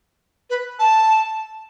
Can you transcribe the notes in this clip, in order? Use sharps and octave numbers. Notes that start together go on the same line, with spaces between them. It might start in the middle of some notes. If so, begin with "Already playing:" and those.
B4
A5